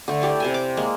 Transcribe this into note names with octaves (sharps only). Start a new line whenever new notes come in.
D3 A3
E4 G4 D5
C3 C5 G#5
D6
G#3 A#3